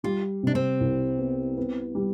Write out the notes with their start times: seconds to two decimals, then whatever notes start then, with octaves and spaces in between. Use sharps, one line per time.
0.04 G3 F4
0.43 C3 D4
0.55 C4
0.80 C2
1.18 B3
1.57 B3
1.95 G3